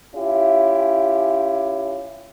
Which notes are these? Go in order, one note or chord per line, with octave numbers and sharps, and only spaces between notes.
C#4 E4 F4 G4